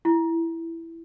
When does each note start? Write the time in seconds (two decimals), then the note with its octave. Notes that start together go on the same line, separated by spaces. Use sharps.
0.05 E4